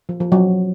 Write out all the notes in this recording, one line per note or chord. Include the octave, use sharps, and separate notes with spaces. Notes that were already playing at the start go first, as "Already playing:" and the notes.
F3
F3
F#3